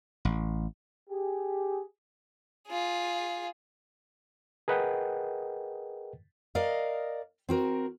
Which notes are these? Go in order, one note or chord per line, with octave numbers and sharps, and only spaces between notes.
A1
G4 G#4
F4 G#4
G#4 A#4 B4 D#5 F#5 G5
A#4 D5 D#5 F5
C4 F#4 A#4